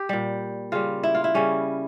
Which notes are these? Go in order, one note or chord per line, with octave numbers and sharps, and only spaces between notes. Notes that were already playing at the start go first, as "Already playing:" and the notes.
Already playing: G4
A#2 G3
C#3 G3 F4
E4
F4
E4
C#3 G3 C#4